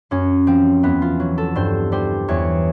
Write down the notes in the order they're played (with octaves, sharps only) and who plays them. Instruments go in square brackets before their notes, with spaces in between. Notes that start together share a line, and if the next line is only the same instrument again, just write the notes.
[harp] F#2 C#4
F3 C4
E2 B3
F4
F#3
A4
G2 C5
G3 C5
E2 C#5